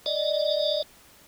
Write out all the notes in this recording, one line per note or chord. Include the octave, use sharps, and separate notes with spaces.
D5 D#5